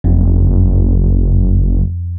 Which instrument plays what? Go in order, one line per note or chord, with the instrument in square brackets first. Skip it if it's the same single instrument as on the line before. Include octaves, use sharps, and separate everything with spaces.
[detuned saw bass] F#1 [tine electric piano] F2